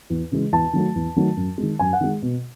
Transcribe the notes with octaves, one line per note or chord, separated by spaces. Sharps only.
E2
C#3 E3 G#3
E2 A5
D#3 F#3 A3
E2
D#3 F#3 A3
F#2
G#3
D#3
F#2 G#5
F#5
D#3 G#3
B2